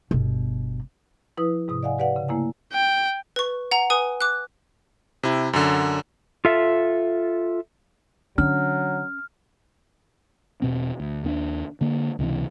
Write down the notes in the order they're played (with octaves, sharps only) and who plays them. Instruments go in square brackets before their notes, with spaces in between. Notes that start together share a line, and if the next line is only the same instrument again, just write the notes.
[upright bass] G1 B2
[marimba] F3 E4 B4 D#6
G#2 C3 D#6
D5 D#5 F5 F#5 G#5
G4 B4 D5 F5 F#5
C#3
A3 A#3 E4 G#5
[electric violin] G5
[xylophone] B4 C#6
F#5 A#5
B4 G#5 D#6
D6 F#6
[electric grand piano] C3 E4
F#2 D3
[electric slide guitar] F4 A4 E5
[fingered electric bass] D3 [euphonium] F#3 [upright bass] C#4 [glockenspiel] F6
[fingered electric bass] E1 B2 C4
D2
D#2 C#4 D4
D3 A#3
C#2 C3 E3